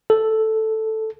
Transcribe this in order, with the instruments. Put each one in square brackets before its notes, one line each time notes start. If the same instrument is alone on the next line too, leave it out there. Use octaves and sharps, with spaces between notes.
[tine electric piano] A4